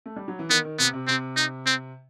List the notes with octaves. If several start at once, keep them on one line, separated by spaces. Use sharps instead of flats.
A3
G3
F#3
E3
D#3 B3
D#3
C3 B3
C3
C3 C4
D#4
C4